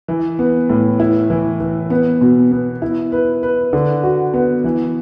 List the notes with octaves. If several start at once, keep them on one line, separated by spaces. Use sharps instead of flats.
E3
B3
A2
E4
E3
E3
B3
B2
B3
E4
B4
B4
D3
F#4
B3
E3